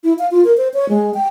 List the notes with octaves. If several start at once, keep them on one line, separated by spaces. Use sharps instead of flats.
E4
F5
F4
A#4
C5
C#5
G#3
G5